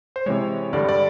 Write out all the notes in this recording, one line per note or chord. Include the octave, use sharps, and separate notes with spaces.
C5
C3 E3 G#3 C#5
G2 D3 G3 D5
D5